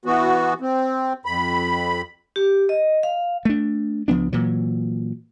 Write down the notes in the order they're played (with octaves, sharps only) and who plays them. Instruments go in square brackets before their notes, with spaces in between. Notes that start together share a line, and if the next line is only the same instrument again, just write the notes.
[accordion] E3 B3 F#4
C4
F2 B5
[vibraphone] G4
D#5
F5
[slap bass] A3 D4
C#2 F3 B3 D4
A#2 E3 F#3